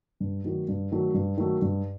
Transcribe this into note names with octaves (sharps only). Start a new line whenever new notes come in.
G2
D#3 F#3 A3
G2
D#3 F#3 A3
G2
D#3 F#3 A3
G2